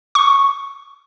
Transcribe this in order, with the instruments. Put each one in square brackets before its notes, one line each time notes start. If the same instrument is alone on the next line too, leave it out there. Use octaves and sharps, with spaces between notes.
[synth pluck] C#6